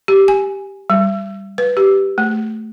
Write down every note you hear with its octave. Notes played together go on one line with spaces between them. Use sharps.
G4
G#5
G3
B4
G4
A3